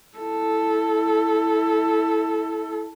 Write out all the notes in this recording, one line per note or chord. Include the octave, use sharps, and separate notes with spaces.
E4 A4